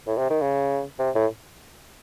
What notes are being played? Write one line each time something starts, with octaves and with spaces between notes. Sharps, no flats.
A2
C3
D#3
C#3
C3
A2